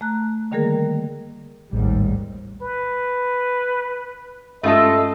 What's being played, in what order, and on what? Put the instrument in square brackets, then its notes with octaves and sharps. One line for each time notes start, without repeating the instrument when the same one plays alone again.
[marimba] A3 A#5 F#6
D3 D#3 G3 A#3 G#4 A#4
[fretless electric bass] A1 [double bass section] D#2 G#2 G3
[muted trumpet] B4
[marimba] G2 G#3 C#4 [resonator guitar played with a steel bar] A3 F4 A4 [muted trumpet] D#5